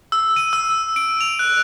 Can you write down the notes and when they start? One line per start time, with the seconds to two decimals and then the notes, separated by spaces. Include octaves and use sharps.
0.12 E6
0.36 D#7
0.53 E6
0.96 D7
1.21 F7
1.39 F#6